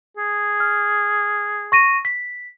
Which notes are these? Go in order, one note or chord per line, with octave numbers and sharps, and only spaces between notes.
G#4
F6
C#6 A#6 D#7
B6